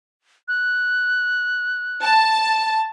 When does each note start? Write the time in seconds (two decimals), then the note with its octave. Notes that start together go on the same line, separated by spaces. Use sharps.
0.48 F#6
2.03 A5